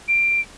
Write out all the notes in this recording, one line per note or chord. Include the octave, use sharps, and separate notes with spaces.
D7